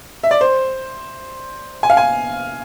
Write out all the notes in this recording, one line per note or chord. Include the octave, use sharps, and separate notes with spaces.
E5
D5
C5
G#5
F5
G#5